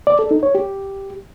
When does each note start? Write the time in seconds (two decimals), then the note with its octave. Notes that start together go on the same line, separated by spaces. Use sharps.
0.07 D5
0.19 A4
0.31 D#4
0.43 C#5
0.55 G4